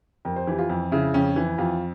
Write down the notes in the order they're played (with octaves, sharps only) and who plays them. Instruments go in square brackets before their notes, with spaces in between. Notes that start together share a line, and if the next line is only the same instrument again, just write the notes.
[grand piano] F2 A#4
C5
E3 G4
F4
F2
C#3 E4
F2 C#4
E3
F2 F4